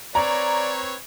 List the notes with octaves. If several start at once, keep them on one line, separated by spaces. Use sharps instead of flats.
C4 B4 C#5 D5 A#5